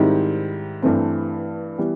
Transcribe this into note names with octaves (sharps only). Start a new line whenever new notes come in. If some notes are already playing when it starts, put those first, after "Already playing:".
Already playing: G#2 D#3 G3 C4 E4
G2 E3 A3 C4
E3 G3 B3